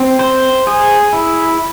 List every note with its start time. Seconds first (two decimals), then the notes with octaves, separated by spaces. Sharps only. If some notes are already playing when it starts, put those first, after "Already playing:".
Already playing: C4
0.19 C5
0.67 G#4
1.13 E4